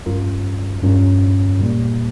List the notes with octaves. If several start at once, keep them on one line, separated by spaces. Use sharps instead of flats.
G2 G3 C#4 F4 A#4
G2 G3 C#4 F4 A#4
A#2 G3 A#3